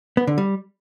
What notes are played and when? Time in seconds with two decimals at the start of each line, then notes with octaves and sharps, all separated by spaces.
0.17 B3
0.27 D3
0.38 G3